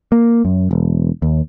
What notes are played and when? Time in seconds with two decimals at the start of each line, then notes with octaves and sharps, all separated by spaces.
0.12 A#3
0.45 F#2
0.71 E1
1.22 D#2